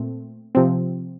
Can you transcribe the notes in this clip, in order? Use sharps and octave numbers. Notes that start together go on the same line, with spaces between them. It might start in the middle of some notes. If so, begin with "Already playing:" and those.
Already playing: A#2 A3 C4
C3 F3 C4